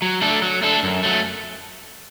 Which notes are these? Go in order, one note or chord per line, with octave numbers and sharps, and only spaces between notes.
F#3
A3 D4 A4
F#3
A3 D4 A4
F#2
F#3 A3